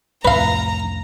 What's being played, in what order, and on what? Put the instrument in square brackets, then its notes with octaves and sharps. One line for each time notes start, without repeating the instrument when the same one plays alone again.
[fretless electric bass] C2 F2 A2 [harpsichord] B4 F5 [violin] A#5